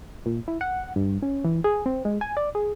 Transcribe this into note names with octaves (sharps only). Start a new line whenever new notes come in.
A#2
E4
F#5
G2
C#4
E3
G#4
C4
G#3
G#5
D5
G#4